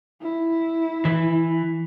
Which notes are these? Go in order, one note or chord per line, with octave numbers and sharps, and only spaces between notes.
E4
E3